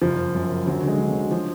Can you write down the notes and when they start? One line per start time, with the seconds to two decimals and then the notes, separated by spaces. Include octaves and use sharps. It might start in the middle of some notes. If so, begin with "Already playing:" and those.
0.02 F#1 F3
0.18 F#1
0.35 F#2
0.51 C#3
0.66 D2 F#3
0.82 D3
0.88 G#3
0.99 D3
1.10 F#3
1.15 D2
1.31 F3